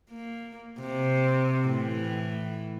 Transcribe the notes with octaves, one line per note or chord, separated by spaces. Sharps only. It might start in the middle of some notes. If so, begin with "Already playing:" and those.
A#3
C3
A2 E3